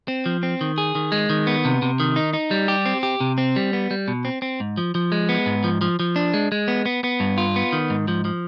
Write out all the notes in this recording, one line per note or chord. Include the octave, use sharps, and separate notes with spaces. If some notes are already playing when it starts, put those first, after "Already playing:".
C4
F3
C4
D#3
G#4
D#3
G#3
D#3
B3
C3
C3
D#3
D#4
D#4
G3
G4
C4
G4
C3
C4
G3
B3
G3
B2
C4
C4
G#2
F3
F3
G#3
B3
G#2
F3
F3
F3
D4
G#3
G#3
B3
B3
B3
G2
F4
B3
D#3
G#2
F3
F3